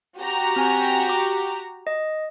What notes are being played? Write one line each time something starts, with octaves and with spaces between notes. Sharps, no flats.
F#4 G4 A#5
C4 G#5
D6
D#5